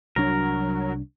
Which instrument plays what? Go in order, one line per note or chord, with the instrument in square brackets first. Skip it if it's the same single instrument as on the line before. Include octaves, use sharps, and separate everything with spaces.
[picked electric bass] C2 D4 [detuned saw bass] F#3 [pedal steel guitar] A#4